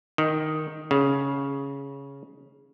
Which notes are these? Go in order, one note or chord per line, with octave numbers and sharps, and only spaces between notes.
D#3
C#3